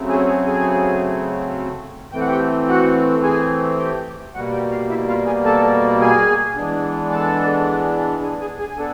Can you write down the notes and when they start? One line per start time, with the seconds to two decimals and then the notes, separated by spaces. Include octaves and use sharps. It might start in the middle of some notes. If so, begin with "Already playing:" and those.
Already playing: C#3 F#3 A3 C4
0.09 G#4 G#5
0.28 G#4 G#5
0.46 G#4 G#5
2.12 E3 A3 C4 G5
2.21 F#5
2.28 G4 G5
2.68 F#4 F#5
3.23 G#4 G#5
3.79 G4 G5
4.34 B2 G3 A#3 F#4 F#5
4.52 G4 G5
4.71 F4 F5
4.89 E4 E5
5.08 F4 F5
5.26 G#4 G#5
5.45 A4 A5
6.01 G#4 G#5
6.56 E3 G#3 B3 D4
7.11 A4 A5
8.22 G#4 G#5
8.40 G#4 G#5
8.59 G#4 G#5
8.71 G#5
8.78 B3 D4 A4